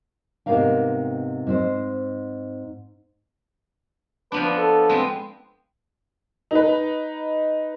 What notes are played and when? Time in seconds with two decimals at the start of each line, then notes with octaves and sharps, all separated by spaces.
0.46 G#2 C3 B3 A#4 F5 G5
1.47 G#2 C4 C5
4.32 F3 B3 D4 B4
4.58 A4
4.89 G#3 B3 C4
6.51 D#4 B4